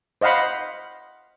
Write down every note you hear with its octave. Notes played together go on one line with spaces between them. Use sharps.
C5 D#5 F5 F#5 B5